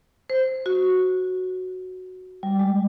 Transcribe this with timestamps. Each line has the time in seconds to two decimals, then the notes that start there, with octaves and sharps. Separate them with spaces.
0.30 C5
0.66 F#4
2.43 G3
2.59 G#3